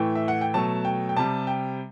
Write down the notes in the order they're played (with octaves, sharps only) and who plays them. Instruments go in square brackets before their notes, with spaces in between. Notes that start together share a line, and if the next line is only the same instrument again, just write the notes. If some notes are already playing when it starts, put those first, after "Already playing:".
Already playing: [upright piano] A2 E3 A3 G5
E5
F#5
G5
B2 F#3 A3 A5
G5
G5
C3 G3 A5
G5